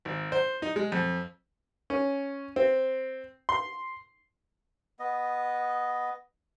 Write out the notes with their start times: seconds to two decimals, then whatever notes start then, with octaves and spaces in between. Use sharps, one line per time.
0.05 G#1
0.32 C5
0.62 D#4
0.76 G#3
0.92 F2
1.90 C#4
2.56 C4
3.49 C6
4.99 B3 D#5